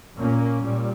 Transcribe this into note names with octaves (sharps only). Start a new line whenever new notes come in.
A#2 A#3 C#4
A#2 G3